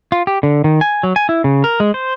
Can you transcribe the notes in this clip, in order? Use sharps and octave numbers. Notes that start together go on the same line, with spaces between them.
F4
G4
D3
D#3
G#5
F#3
G#5
E4
C#3
A#4
G#3
C5